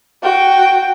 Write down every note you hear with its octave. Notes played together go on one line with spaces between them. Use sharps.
F#4 G5